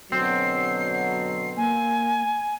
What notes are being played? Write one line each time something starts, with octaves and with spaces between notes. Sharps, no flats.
B2 D3 F#3 C4 C7
A#3 G#5